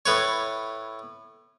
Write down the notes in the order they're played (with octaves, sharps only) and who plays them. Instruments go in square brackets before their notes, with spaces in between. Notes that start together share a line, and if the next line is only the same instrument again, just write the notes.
[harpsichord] A2 B4 C#5